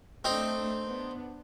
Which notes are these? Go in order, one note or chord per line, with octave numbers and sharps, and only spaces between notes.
A3 C4 D4 D#4
B3 D4